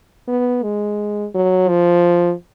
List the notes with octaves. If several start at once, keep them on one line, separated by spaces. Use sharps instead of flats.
B3
G#3
F#3
F3